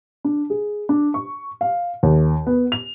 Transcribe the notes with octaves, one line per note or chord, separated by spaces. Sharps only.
D4
G#4
D4
C#6
F5
D#2
B3
F7